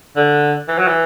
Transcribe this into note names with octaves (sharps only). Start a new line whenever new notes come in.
D3
E3
F#3
E3